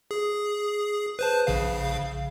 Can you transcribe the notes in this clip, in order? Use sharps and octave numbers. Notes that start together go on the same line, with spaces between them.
G#4
B4 C5 A5
A#1 C#3 F5